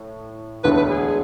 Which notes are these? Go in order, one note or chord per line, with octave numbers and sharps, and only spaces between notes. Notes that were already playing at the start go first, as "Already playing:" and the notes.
Already playing: A2
E1 D2 D3 B4
B4
G#4